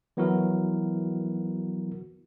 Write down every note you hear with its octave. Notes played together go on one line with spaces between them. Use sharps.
E3 F#3 B3 E4 F#4 A#4